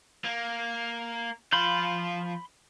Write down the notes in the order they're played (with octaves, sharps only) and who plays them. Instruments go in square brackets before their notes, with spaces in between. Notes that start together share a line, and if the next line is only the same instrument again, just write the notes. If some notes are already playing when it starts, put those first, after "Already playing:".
[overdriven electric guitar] A#3
[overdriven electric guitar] F3 F5 [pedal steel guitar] B5 C6 G6